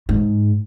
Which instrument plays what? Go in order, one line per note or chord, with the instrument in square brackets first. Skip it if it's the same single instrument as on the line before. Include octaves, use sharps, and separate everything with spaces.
[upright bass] G#2